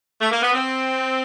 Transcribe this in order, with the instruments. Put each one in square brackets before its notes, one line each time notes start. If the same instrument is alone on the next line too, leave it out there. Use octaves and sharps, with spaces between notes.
[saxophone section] A3
A#3
B3
C4